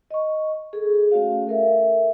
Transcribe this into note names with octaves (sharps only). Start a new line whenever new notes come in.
D#5 C#6
G#4 A4
A3 C#4 F#4 C#5 F5
A4 A#4 E5